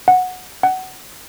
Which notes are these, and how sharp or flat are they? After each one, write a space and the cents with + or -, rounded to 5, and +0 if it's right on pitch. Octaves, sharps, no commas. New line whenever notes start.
F#5 -10
F#5 +20